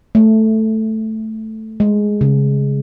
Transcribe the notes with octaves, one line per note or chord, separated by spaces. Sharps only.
A3
G#3
C#3